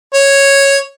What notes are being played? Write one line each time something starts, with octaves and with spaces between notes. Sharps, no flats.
C#5